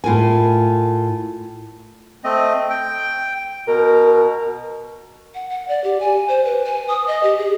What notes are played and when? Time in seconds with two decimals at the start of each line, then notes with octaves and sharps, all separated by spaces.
0.04 A2 F4 A#4 G#5
2.24 A3 C4 D#5
2.70 G5
3.67 B2 A#4
5.34 F#5
5.50 F#5
5.68 D5
5.84 G4
6.00 G#5
6.29 C5
6.45 B4
6.65 G#5
6.88 D#6
7.07 D#5
7.23 G4
7.38 G#4